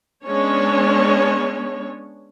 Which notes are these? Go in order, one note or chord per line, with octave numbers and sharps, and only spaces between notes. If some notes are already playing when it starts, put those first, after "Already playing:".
G#3 B3 C#4 D4 C#5